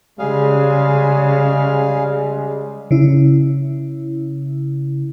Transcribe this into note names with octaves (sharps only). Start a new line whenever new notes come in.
C#3 G3 G#3 G#4 F5
C#3 E4